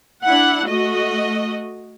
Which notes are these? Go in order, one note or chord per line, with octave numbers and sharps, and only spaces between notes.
D4 E4 F#5
A3 F#4 D#5